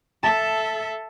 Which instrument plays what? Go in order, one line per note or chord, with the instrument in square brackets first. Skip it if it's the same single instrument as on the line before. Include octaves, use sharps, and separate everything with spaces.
[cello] A4 E5 [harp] A5